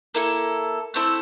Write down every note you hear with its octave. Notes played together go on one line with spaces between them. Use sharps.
A#3 E4 A4
A3 C4 E4 A4